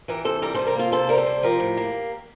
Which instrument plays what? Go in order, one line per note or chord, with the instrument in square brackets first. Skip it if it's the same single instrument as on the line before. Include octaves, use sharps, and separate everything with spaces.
[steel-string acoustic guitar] E3 G4 A#4
C3 A4 C5
G3 G4 A#4
C3 A4 C5
G4 A#4
A#3 F4 A4
C3 A4 C5
G3 A#4
A4 C5
C3
F3 G4 A#4
A2
A#3